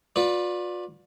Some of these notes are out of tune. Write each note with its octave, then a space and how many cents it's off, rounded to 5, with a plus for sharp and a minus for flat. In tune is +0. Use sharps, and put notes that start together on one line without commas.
F4 +40 B4 +0 D5 +0